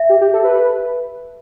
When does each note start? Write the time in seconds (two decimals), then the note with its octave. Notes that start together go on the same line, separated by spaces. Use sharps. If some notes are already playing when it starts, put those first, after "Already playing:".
Already playing: E5
0.09 G4
0.21 G4
0.34 A4
0.45 B4